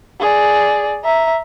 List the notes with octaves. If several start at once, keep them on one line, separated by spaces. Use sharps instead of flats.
G#4 D5
E5 A#5